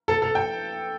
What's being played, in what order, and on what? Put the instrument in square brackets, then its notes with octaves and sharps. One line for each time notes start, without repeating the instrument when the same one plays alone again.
[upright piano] A4
A4
G5